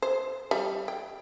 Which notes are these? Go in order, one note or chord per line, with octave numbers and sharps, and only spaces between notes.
C5
G3
G5